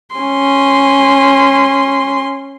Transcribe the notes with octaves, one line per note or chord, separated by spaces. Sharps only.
C#4 C6